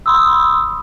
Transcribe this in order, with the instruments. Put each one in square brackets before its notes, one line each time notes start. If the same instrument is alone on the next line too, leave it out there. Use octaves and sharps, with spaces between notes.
[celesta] B5 C6 D#6 E6